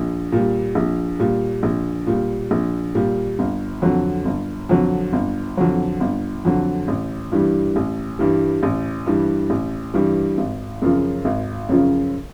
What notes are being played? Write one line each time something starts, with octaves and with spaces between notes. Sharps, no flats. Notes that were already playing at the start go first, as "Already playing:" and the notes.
Already playing: A#1
A#2 G3
A#1
A#2 G3
A#1
A#2 G3
A#1
A#2 G3
G1
F2 D3 F#3
G1
F2 D3 F#3
G1
F2 D3 F#3
G1
F2 D3 F#3
A1
G2 E3 G3
A1
G2 E3 G3
A1
G2 E3 G3
A1
G2 E3 G3
G#1
F#2 C#3 F3
G#1
F#2 C#3 F3